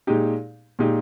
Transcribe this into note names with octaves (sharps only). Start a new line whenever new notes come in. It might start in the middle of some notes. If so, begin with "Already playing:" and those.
A#2 G#3 D#4 G4
A#2 G#3 D#4 G4